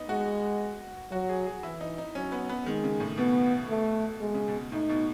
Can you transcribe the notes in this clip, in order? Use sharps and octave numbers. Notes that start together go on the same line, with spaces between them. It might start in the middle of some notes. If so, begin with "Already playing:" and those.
Already playing: B3 D#4
G#3 F#4
F#3 F#4
G#4
G#4
E3 E4
D#4
D#4
F#3 C#4
B3
B3
D#3 G#3
C#3
A2
B2 B3
A3
B2 G#3
C#3
B2
A2 D#4
B2